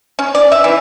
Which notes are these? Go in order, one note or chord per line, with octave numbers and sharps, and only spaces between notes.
C#4
D5
E5
E3